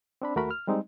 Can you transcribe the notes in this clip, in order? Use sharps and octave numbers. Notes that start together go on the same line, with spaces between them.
C4 D4 B5
D#2 A3 F#4 A#4 B5
F6
G3 G#3 C4 D#4